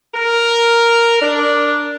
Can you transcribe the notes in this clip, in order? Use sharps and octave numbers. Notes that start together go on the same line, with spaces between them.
A#4
D4